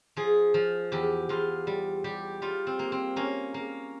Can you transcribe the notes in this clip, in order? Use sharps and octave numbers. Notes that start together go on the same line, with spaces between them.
F3 G#4
F3
E2 G4
E2 F4
G3
G3 G4
G3 F4
C4
A#3
C4
A#3 C#4
A#3